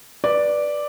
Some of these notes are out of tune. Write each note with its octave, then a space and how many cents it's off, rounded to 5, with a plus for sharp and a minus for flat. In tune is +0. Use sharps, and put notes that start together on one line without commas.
B4 -15 D5 +0 D6 +0